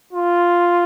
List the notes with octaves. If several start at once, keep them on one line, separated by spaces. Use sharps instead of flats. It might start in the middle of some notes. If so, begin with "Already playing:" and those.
F4